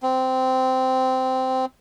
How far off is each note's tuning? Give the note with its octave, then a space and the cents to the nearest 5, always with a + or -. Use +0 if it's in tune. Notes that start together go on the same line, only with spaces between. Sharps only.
C4 -15